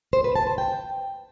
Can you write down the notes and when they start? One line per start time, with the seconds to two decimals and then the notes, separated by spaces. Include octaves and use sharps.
0.13 C5
0.24 B4
0.36 A5
0.47 C5
0.58 G5